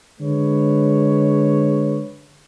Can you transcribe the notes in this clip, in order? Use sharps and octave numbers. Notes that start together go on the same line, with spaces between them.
D3 G#3 B4 C#5